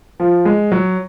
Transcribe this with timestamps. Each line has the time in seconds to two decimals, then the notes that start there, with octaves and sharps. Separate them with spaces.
0.20 F3
0.45 G#3
0.72 F#3